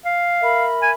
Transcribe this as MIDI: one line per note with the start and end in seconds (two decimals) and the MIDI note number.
0.06 0.66 77
0.42 0.93 70
0.42 0.93 76
0.42 0.93 83
0.82 0.91 80